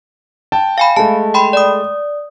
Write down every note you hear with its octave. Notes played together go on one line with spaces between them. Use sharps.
G5 A5
F5 G#5 B5
G#3 A3 A5
G5 B5 C6
D5 D#6